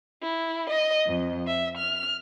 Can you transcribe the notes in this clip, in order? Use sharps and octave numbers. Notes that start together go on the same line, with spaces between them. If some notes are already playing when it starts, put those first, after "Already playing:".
E4
D#5
F2
E5
F6